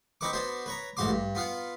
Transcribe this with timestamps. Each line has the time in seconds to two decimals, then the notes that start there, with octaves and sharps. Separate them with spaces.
0.21 C4 D#4 B4 C#6 D6
0.33 B3 D4 F#4 C5
0.66 B4 C#5 A#5
0.97 A1 E2 G#2 F#4 C6 D6
1.09 G2
1.35 B3 F4 F5 F#5